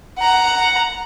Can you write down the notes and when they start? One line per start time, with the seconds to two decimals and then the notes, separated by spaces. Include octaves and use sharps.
0.18 F#5 A#5